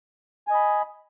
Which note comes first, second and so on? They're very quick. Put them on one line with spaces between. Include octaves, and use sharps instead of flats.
G#5 D#5 B5